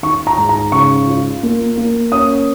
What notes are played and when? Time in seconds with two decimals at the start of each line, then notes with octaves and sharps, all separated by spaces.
0.03 D#3 C#6
0.27 A#5
0.38 G#2
0.49 A#5
0.72 C#3 C#6
1.07 F4
1.43 A#3
1.77 A#3
2.12 C#4 D#6